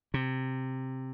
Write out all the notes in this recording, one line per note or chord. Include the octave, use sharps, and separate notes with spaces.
C3